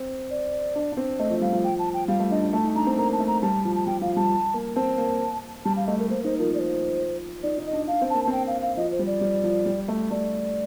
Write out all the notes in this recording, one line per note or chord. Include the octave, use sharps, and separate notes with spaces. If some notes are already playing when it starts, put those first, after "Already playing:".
Already playing: C4
D5
D4
D4
C4
A3 D#5
F3
G3 F5
F3
G5
A5
G5
G3 F5
A3
D4 D#5
D4
A3 A5
D#4
D4 A#5
C4
A#3 A#5
A5
A3
A#5
G3 A5
F3
A5
G3 G5
F3 F5
G3 A5
A#3
C4 A5
A#3
G3 A5
F5
A3 D#5
A#4
A#3 C5
D#4 C5
F3 A#4
D5
C5
D#4 D5
D#4
D#5
D4
D4 F5
C4
A#3 A5
A5
C4 G5
F5
F5
F3 D#5
C5
G3
D5
G3
F3
G3
A3
A3 D5